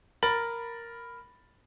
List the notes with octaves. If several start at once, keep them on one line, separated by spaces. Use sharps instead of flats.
A#4 B5 A6 F#7